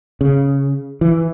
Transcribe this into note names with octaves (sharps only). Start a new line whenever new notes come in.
C#3
E3